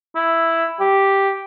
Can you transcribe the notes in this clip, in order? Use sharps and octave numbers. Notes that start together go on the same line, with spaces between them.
E4
G4